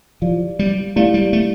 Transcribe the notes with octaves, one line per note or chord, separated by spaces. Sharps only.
F3 E4 G4 D5 F5
G3
A3 E4 G4 D5 F5
G3
A3